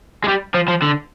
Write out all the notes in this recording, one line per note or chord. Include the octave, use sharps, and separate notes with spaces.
G#3
G3
F3
F3
D3